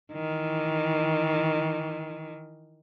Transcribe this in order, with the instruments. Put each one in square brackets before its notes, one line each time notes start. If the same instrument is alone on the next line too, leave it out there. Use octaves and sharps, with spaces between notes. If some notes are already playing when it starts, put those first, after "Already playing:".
[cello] D#3 E3